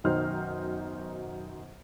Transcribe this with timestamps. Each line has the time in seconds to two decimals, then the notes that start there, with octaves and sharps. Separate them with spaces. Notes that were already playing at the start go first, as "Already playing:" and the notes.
0.04 F#2 B2 D#3 D#4 C5 F6